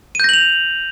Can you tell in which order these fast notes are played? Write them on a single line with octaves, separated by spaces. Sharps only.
D#7 G6 A#6 F#7 F7